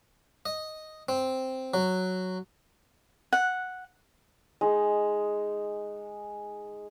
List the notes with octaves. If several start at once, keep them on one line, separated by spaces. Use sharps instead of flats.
D#5
C4
F#3
F#5
G#3 D#4